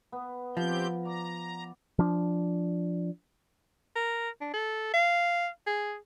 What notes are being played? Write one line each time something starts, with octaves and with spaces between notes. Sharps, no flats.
B3
F3 C4 G4 G6
D5 A#5
F3 D4
A#4
D4
A4
F5
G#4